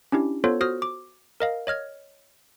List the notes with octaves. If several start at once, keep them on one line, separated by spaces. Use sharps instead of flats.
C#4 D4 E4 G4
B3 F4 A4 C5 C#5
F#4 C5 D#6 F6 A#6
D6
A#4 D#5 F5
C#5 D#5 F6 G#6